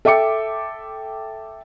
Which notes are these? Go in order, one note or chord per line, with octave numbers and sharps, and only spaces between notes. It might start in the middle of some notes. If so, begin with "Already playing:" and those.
A4 E5 G5 D6 C#7